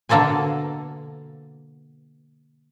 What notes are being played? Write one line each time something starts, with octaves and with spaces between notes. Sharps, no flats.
B2 D3 A#3 A4 C5 G#5